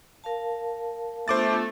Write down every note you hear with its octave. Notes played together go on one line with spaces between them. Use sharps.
A#4 F5 A5
A3 B3 D4 F4 C5 D6 A6